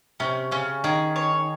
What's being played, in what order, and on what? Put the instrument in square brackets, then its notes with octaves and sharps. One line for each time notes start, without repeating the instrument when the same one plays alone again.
[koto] C3 [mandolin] C#4
[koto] C#3 [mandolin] C#4
[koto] D#3 [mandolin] G#4
[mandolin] C#5